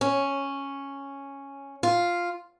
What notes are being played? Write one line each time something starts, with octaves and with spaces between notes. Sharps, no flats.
C#4
F4